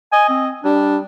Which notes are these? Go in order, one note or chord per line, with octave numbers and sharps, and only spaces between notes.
D#5 G#5
C4
G3 D4